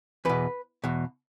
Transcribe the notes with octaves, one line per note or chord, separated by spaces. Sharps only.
E2 B2 B4
E2 B2